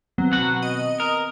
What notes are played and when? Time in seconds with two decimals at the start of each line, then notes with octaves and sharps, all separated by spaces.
0.18 D#3 F#3 B3 C4
0.32 B2 F#4 F#5
0.62 D#5
1.00 A#4